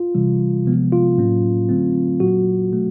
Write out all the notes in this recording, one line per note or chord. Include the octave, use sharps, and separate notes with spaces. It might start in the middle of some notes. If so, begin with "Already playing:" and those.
Already playing: F4
C3 E3 G3
C3 F3 G#3 B3
F4
A2 F#3 A#3 C#4
D3 F#3 A3 C4
A#2 F#3 A#3 F#4
B2 F#3 A3